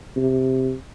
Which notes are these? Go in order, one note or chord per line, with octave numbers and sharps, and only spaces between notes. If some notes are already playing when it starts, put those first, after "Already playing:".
C3